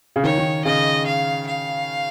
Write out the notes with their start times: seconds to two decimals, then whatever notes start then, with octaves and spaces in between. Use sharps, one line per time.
0.16 C#3
0.23 D#3 C#5
0.38 D#3
0.65 C#3 D#5
1.06 F5
1.47 F5